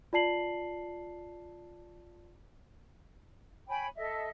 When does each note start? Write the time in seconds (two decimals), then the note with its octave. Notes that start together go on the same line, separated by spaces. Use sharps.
0.13 F4 D5 A5 C7 F#7
3.68 C#5 G5 G#5 B5
3.96 A4 D#5 E5